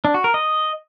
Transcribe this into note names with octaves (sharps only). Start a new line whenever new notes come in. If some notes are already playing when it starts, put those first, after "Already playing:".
D4
F#4
A#4
D#5